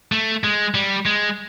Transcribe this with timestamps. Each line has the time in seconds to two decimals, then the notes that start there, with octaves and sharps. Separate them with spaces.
0.12 A3
0.44 G#3
0.75 G3
1.06 G#3